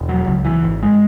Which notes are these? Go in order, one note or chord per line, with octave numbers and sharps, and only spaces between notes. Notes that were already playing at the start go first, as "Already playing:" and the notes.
Already playing: E1
F#3
C#2
E3
G#1
G#3